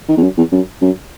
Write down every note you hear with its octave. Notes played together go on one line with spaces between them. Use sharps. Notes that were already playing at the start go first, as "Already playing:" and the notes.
D#3
E2
F#2
E2
F#2
F#2